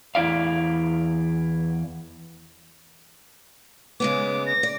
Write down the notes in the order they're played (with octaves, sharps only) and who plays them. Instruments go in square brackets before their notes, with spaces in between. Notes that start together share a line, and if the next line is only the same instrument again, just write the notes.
[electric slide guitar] E2 E4 D5 F5
[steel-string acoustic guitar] C#3 G#3 B3 [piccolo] D6
[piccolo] A#6
[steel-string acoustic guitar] D5